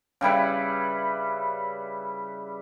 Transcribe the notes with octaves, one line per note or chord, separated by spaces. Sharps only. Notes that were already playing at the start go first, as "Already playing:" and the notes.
C#3 G3 E4 B4